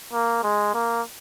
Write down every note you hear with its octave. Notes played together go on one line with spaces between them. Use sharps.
A#3
G#3
A#3